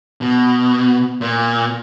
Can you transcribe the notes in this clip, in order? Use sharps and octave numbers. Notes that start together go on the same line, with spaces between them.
B2
A#2